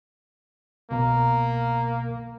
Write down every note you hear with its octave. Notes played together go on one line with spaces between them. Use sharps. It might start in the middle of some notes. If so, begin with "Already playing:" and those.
C2 B2 A#3 A#5